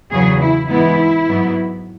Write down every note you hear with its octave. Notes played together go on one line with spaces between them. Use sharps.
E2 C#3 F#3 B3 G#4
E4
G#2 E3 G#3 B3 E4
G#2 F#3 B3